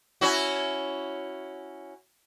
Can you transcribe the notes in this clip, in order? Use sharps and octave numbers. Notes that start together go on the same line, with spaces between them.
C#4 E4 F#4